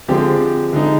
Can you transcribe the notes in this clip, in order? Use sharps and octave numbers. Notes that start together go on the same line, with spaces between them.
D3 F3 G#3 C4 G4
D3 G#3 D#4